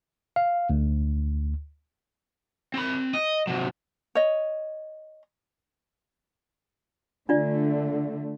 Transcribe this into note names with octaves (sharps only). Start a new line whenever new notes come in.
F5
D2
C4 B5
D#5
C3 F#3
C#5 D#5
D3 A3 D4 F4 D5